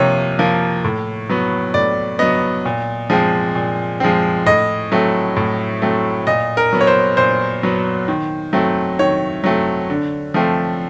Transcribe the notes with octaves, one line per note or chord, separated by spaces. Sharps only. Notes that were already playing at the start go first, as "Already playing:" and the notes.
Already playing: C3 F3 A#3 C#5
F3 A#3
A2
F#3 B3
A2 D5
F#3 B3 D#5
A#2
F3 G#3 C4
A#2
F3 G#3 C4
A2 D#5
F#3 A3 C4
A2
F#3 A3 C4
A#2 D#5
A#4
F#3 B3
C#5
C5
A#2 C5
F#3 B3
D#3
F#3 A3 C4
D#3 C#5
F#3 A3 C4
D3
F3 A3 C4